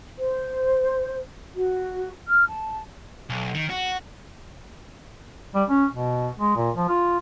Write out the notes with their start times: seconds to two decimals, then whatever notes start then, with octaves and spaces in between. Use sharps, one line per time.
0.18 C5
1.55 F#4
2.27 F6
2.47 A5
3.30 B1
3.55 D#3
3.70 F#4
5.55 G3
5.70 C#4
5.92 B2
6.39 G#3
6.56 A#2
6.77 F3
6.89 F4